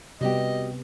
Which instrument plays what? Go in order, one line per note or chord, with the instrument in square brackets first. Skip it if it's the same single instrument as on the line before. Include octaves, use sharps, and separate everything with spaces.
[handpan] C3 B3 [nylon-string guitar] G3 F#4 G4 [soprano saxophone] D#5